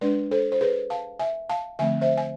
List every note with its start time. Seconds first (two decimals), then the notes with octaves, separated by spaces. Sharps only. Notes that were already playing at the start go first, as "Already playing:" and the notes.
0.01 G#3 D4 B4 D5
0.31 A4 C5
0.52 C5
0.61 G#4 B4
0.90 F5 A5
1.20 E5 G#5
1.50 F5 A5
1.79 D3 F3 A3 C4 E5 G#5
2.01 C5 E5
2.18 G#5